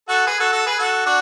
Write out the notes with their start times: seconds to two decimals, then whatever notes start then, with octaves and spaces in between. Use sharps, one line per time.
0.09 F#4 A4
0.26 G#4 B4
0.40 F#4 A4
0.52 F#4 A4
0.66 G#4 B4
0.79 F#4 A4
1.06 D4 F#4